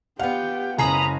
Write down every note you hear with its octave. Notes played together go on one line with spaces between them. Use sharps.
B3 F4 G4 F#5 G5
F#1 G#3 C#4 G#5 A#5 B5 D#6 C7